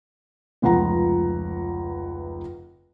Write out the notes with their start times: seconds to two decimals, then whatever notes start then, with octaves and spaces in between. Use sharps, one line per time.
0.62 F1 C#2 F3 F#5 A#5